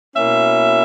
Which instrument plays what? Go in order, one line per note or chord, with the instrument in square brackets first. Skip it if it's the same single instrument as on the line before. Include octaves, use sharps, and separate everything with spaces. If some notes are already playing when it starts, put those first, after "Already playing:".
[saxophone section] B2 A#3 C#4 E4 E5